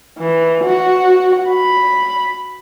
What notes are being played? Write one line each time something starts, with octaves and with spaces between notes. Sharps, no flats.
E3
F#4
B5